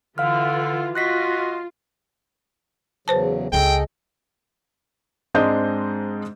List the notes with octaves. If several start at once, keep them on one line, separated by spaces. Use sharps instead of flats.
D3 E3 F4 F5 F6
F4 F#4 D#5 C6 F#6 A#6 B6
E2 C#3 F#3 B4 C5 A5
C#2 C4 G#4 A4 D#5 G5
G#2 G#3 C4 D4 D#5 G6